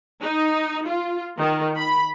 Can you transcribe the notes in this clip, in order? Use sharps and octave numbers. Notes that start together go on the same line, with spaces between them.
D#4
F4
D#3
B5